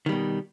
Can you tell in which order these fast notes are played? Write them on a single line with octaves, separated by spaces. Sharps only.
D#3 G3 B2